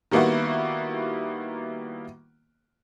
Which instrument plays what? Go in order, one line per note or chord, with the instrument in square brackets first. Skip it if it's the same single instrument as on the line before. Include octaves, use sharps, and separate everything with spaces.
[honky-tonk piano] D#3 G3 A#3 B3 E4 F#4